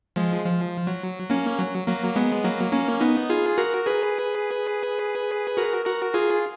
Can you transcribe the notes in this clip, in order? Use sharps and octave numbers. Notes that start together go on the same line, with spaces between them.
F3 G#3
F3
F#3
A#3 C#4
F#3
F#3 A#3
G#3 B3
F#3 A#3
A#3 C#4
B3 D#4
F4 G#4
F#4 A#4
G#4 B4
F#4 A#4
F#4 A#4
F4 G#4